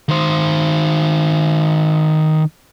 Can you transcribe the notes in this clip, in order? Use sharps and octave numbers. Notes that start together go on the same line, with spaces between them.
D#3 C5